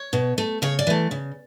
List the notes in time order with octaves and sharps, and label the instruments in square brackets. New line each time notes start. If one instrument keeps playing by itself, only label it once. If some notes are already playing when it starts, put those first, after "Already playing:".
Already playing: [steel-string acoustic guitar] C#5
B2
A3
C#3 C#5
D5
E3 A3
C#3